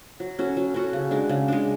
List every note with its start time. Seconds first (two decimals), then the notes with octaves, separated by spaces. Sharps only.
0.20 F#3
0.39 C#4 F#4 A4
0.57 F#3
0.74 C#4 F#4 A4
0.93 C#3
1.11 G#3 D4
1.29 C#3
1.48 G#3 D4